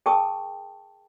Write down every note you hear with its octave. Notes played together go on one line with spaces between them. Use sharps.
G#4 A#4 G5 A5 C#6 D#6